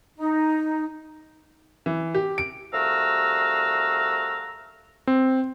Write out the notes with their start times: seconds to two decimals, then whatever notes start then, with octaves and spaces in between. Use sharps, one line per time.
0.17 D#4
1.86 E3
2.15 G4
2.38 D7
2.73 C2 A3 F#4 F5 A#5 E6
5.07 C4